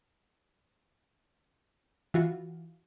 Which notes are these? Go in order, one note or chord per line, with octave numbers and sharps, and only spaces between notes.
E3 F4 F#4